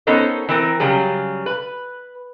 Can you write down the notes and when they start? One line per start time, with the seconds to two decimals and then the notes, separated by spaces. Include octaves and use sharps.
0.07 B3 C#4 D#4 A4 A#4 C5
0.49 E3 C4 A#4
0.80 C#3 F#3 G3 G#4
1.46 B4